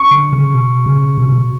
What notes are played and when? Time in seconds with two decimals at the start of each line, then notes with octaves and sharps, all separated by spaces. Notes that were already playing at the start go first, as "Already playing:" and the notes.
Already playing: C#6
0.11 D3
0.33 C#3
0.54 B2
0.86 C#3
1.18 B2
1.26 C#3
1.32 B2